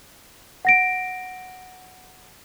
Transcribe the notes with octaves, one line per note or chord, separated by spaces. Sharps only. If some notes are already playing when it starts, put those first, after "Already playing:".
F#5 A#6 D7